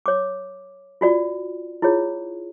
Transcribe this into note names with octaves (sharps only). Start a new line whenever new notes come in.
C#5 D6
F4 F#4 D5
E4 F4 G#4 C#5